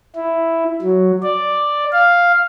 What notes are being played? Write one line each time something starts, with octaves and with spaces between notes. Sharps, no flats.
E4
F#3
D5
F5